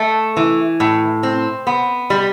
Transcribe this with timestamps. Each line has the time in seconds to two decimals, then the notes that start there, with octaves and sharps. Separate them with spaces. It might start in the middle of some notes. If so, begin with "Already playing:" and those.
Already playing: A3
0.37 E3
0.80 A2
1.23 C4
1.67 B3
2.10 G3